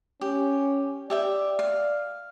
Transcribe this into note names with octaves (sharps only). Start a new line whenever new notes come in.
C#4 G4
G4 D5 E5 G5
F5